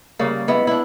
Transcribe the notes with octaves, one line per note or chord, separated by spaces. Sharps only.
C#3 G3 A#3
G#3 B3 E4
D4 E4